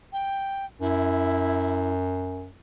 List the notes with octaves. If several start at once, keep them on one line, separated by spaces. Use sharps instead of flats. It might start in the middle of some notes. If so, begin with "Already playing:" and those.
G5
F#2 E4